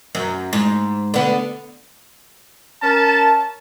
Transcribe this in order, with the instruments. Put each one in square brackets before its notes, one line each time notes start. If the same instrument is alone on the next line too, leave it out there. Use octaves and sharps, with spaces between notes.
[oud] F#2
G#2
D3 B3
[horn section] C#4 A#4 A5